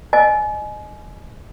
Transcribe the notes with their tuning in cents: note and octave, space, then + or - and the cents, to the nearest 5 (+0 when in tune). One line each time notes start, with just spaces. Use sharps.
D#5 -25 G#5 +25